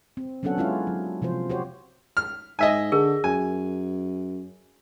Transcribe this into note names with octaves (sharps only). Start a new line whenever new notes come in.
C4
F#3 B3 C#4 D4 A4 F#5
G#3 C#4 E4 F4 F5
F#3
C3 F3 F4 C5
F#4 G4 C5 C#5
F6
G#2 D#5 E5 G#5
D3 G#4 A#4
F#2 G#5